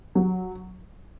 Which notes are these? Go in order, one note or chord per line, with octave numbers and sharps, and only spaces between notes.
F#3